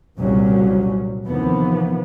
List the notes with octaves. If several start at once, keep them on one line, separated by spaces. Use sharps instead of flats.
F#1 C2 A#2 F#3 G3 C#4
D#2 C3 E3 F3 B3